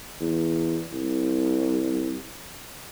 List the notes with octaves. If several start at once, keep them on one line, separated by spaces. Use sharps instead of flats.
E2
C2